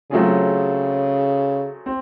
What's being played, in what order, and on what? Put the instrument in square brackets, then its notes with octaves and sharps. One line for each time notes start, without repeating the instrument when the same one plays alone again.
[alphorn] C#3 [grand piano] F#3 A3 C4 F4 G#4
[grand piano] C4